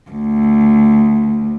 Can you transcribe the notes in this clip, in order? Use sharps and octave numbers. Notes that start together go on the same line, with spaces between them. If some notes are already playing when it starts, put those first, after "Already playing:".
D2